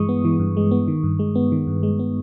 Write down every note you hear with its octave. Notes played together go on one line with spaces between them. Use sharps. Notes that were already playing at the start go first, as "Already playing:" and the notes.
Already playing: G2 E3 G#3 C#6 D#6
B3
E3
G2
G#3
B3
D#3
G2
G#3
B3
D#3
G2
G#3
B3